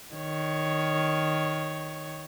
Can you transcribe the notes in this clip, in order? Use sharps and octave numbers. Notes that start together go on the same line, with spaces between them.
D#3 C#5